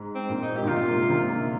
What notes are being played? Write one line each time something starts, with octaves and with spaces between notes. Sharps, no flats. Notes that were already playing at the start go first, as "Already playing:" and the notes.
Already playing: G#2
C4
A#2
D#4
G4
A#2
C3 F4
G#2
C3
D3